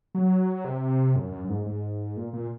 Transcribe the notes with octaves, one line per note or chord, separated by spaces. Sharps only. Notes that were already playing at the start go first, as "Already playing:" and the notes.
F#3
C3
F#2
F#2
F#2
G#2
G#2
A#2
A#2